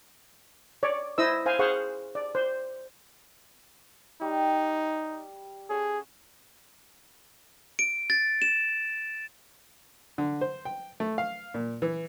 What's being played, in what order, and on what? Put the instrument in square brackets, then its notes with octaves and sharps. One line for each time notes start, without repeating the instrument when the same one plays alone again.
[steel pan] C#5 D5
E4 C5 D#5 E6
C5 F5 G#5
G#4 C5 F5 F#5 C#6
D5
C5
[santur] G3 [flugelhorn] D#4
[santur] C#4 A4 F#5 [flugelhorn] G#4
[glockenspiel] D7
A6
E7
[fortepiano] D3
C5
G5
A3
F5
A#2
E3